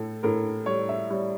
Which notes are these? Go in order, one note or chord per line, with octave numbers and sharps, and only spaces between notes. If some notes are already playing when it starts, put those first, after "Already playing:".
Already playing: A2 A4
A2 A#4
G3 C#5
E5
G3 C#5